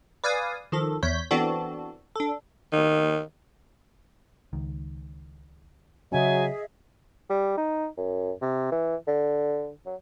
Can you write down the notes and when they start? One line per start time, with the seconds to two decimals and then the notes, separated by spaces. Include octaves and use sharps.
0.24 B4 D5 F5 G#5 D#6
0.72 D#3 F3 A4
1.03 E2 C#5 G6 B6
1.31 E3 B3 C4 D4 F#4 A4
2.16 D4 A4
2.73 D#3
4.53 C#2 D#3
6.12 C#3 F#3 C#4 G#4 D#5 E5 G#5
7.30 G3
7.58 D#4
7.97 F#2
8.42 C3
8.72 E3
9.08 D3
9.86 F#3